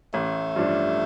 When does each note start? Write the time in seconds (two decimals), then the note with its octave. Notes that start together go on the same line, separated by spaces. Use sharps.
0.13 A1 A3
0.56 G2 F3 D4